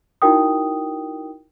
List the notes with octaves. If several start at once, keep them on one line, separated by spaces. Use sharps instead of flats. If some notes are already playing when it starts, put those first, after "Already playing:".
D#4 E4 F#4 A#4 G5 D#6